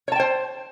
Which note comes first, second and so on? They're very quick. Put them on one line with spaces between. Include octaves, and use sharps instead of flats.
C#5 A5 G5 C5